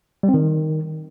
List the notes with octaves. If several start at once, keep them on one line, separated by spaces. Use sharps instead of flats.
G3
C4
D#3